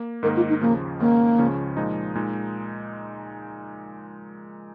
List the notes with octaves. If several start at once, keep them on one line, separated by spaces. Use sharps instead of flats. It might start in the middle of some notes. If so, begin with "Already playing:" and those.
Already playing: A#3
G#2 D#3 A#3 D#4 A#4
F4
D#4
D#2 C#3 F3 A#3
G#2 D#3 A#3 C#4
C#2 C#3 F3 C#4
A#2 F3 G#3 D#4
A#2 G#3 D#4